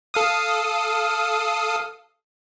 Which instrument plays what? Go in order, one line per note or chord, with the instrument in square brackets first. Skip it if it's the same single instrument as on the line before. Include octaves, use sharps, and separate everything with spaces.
[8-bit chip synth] A4 F5 D#6